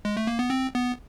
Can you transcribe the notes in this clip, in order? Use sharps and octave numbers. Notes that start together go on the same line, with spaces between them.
G#3
A3
A#3
B3
C4
B3